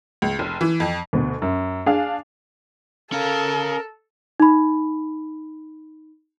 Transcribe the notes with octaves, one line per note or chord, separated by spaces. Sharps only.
C#2
F1
E3
F2
D2 B2
F#2
D4 G#4 F5 G#5
C#4 A4 A#4 F5
D#4 B5